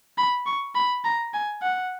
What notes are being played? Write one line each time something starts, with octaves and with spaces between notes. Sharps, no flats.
B5
C#6
B5
A#5
G#5
F#5